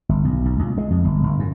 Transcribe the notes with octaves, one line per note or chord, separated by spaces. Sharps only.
G1
B1
B1
C#2
G#3
F2
G1
G1
F#2